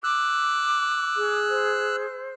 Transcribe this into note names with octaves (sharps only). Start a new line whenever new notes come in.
D6 E6 F#6
G#4
C5